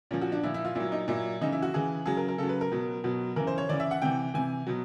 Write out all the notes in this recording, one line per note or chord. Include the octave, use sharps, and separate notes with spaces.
A#2 F3 C#4
F#4
D4
A#2 F3 E4
E4
F4
A#2 F#3 E4
D#4
A#2 F#3 E4
C#3 E3 D#4
E4
F#4
C#3 E3 G#4
C#3 F#3 G#4
A#4
A#4
C#3 F#3 A4
B4
A#4
B2 F#3
B2 F#3
C#3 E3 A#4
C5
C#5
C#3 E3 D5
E5
F#5
C3 E3 G5
C3 E3 G#5
B2 F#3